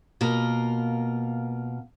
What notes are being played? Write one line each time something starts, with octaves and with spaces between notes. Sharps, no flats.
B2 A#3 F4 A#4